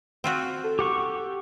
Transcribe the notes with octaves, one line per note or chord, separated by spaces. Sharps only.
C4 F4 F#4
A4
G4 F#5 C#6